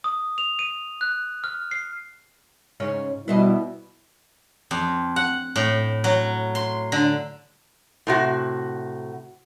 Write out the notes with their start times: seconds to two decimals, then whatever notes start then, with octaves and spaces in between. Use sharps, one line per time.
0.04 D#6
0.38 F7
0.59 D#7
1.01 F#6
1.44 F6
1.71 C7
2.80 G#2 C#3 C#4
3.28 B2 G3 E4 B4 C5 D#5
4.71 F2
5.16 F#5
5.56 A2
6.04 F#3
6.55 C6
6.92 D3
8.07 A2 C3 F#4